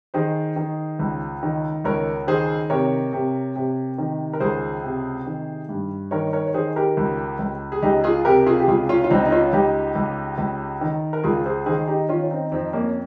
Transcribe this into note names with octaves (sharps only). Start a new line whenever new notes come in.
D#3 G#4 C5
D#3
C#2
D#3
C#2 A#4 C#5
D#3 G#4 C5
C3 A#4 C#5
C3
C3
D#3
A#4
C#2 G#4 C5
C3
D#3
G2
D#3 A#4 C#5
A#4 C#5
C#5
D#3 G#4 C5
G4 A#4
C#2
C#2
G#4
C#2 D#4 G4
F4 G#4
C3 G4 A#4
F4 G#4
G4
C#2 F4 G#4
C#4 F4
F4
C#2 C4 D#4
D#4
C#4 F4
C#2 D#4 G4
C#2
C#2
D#3
A#4
C#2 F4 G#4
G#4 C5
D#3 G#4 C5
D#4 G4
D#3 C#4 F4
C#4
C4 D#4
F2 C4 D#4
A#3 C#4